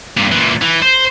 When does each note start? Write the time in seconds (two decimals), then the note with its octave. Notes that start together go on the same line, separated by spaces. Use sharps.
0.18 G2 A#2
0.32 A#2 E3
0.62 E3
0.82 C5